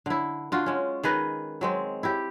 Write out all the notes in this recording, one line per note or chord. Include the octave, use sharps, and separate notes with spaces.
D3 E4
D3 F4 F#4
G#3 C#4
D#3 G#4 B4 D#5
F#3 G#3 C4
E4 G4